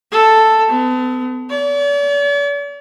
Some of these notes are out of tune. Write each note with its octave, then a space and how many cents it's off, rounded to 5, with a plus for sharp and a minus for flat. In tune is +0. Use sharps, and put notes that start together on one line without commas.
A4 +5
B3 +40
D5 -45